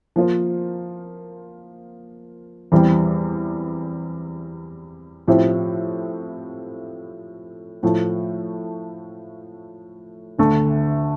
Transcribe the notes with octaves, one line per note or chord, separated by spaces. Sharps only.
F3 A#3 F4 C5
E2 E3 G3 C4
A2 F3 C4 E4 G4
A2 F3 A3
D2 D3 A3